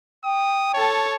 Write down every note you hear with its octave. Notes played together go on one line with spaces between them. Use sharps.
G5 D#6
A4 C#5 A5